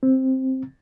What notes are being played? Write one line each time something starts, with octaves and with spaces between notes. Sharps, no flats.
C4